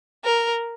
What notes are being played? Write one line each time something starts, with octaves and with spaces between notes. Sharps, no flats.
A#4